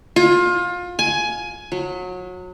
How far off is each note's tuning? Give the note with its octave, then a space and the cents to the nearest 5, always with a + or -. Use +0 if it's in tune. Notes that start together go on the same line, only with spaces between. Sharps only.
F4 +25
G#5 +15
F#3 -25